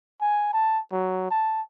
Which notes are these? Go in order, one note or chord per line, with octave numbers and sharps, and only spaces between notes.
G#5
A5
F#3
A5